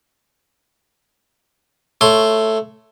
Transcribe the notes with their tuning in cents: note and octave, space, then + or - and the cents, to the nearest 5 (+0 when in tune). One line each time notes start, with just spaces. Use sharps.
A3 +5 C#5 +0 C6 +0